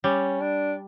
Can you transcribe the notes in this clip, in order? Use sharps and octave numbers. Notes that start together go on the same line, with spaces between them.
G3 C#4
D4